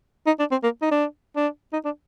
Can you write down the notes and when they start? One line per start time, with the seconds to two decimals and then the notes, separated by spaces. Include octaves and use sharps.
0.26 D#4
0.39 D4
0.51 C4
0.63 A#3
0.82 D#4
0.91 D4
1.36 D4
1.73 D#4
1.85 D4